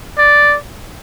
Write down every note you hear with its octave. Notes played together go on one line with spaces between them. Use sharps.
D5